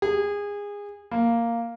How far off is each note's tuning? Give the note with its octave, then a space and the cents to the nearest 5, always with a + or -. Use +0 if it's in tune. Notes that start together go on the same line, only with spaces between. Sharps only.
G#4 -25
A#3 -5